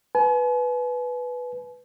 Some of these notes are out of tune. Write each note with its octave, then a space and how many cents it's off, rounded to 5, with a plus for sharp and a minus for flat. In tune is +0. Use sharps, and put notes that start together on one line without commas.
B4 +0 G#5 +45